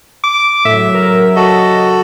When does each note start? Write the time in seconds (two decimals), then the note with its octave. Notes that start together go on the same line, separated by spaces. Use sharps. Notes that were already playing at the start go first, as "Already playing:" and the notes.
0.24 D6
0.65 A2 C#3 F#3 E5
0.94 A#4
1.36 F#4 A4 D#5